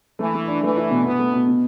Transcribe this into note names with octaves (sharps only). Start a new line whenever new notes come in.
E3 A3
A3
D4
E3 A3
E4
B2
B2 B3
A3
B2
B2